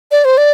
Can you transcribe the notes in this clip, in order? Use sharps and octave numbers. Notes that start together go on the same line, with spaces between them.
D5
C5
D5